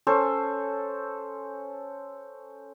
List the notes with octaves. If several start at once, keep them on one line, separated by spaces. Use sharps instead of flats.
C#4 A4 C5 C#6